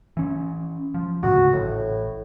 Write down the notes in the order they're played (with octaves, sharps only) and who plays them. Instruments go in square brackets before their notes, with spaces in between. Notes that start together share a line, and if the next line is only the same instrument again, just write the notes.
[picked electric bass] E3 C#4
F3
[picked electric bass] D2 G#2 C#3 [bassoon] F#4
[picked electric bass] A1 [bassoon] A2